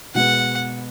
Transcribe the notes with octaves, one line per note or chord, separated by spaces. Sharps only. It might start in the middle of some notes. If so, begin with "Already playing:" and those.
B2 G#3 B3 F#5